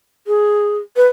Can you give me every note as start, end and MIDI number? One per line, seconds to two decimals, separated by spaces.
0.27 0.78 68
0.97 1.07 71